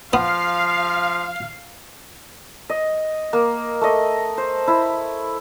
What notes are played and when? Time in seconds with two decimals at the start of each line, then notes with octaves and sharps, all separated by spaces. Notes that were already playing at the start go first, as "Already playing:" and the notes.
0.13 F3 B3 F5
2.70 D#5
3.33 A#3
3.81 A3 D#5
4.38 C5
4.67 E4 B5